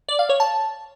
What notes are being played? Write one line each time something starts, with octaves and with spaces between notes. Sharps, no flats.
D5
F5
C#5
A5